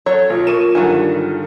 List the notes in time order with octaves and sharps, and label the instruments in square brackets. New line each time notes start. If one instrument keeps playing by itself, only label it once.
[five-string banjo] F#3 C#5 A#5 [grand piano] A4
[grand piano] B1 [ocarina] F4
[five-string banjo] A#4 [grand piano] C#6 D#7 E7
[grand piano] G2 D3 D#3 [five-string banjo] F#3 F#5 G#5